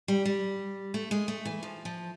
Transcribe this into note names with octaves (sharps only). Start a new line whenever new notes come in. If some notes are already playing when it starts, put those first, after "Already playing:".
G3
G3
A3
G#3
A3
E3
F3
F3